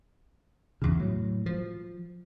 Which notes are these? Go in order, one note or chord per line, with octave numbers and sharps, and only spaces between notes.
E2 C#3
A2 F#3
F3